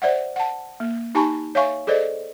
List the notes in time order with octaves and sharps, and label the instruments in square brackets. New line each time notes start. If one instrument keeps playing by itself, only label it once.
[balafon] C5 D5 E5 F#5
F#5 A5
A#3
D#4 G4 G#5 A5 B5 C#6
C#5 E5 F5 G#5 C#6
G#4 A4 C5 D5 D#5